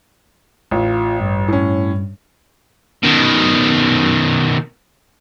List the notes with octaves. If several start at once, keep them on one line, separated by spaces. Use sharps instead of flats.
A1 F4
G2
A2 C#4
B2 D#3